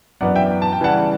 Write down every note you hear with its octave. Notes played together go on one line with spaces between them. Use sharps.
F#2 E3 B3 D4 D5 F#5
E5 G5
A5
G5
C#3 E3 G3 F#5 A5